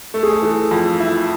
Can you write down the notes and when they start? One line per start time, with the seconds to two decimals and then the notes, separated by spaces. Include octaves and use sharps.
0.14 A3 A4
0.23 G#4
0.33 A4
0.42 E3 G#4
0.71 F2 F4
1.00 E4